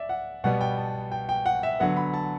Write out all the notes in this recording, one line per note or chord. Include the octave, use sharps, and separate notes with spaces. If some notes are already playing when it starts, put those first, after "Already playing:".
Already playing: D5 E5
F#5
B2 G3 B3 F#5
G5
A5
G5
G5
F#5
E5
D3 F#3 B3 F#5
B5
A5